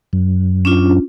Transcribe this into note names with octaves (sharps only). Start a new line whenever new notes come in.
F#2
C#4 D4 F4